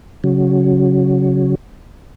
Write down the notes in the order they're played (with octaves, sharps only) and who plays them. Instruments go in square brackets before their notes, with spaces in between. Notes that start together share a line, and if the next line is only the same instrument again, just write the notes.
[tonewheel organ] C#3 F#3